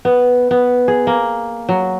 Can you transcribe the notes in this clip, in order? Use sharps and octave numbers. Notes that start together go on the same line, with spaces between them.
B3
B3
G#4
A#3
F#3